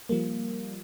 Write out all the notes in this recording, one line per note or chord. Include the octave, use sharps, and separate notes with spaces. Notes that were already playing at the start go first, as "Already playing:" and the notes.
F3 G3 A#3